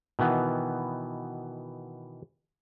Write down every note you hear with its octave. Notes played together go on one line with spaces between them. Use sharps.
B2 D#3 E3 B3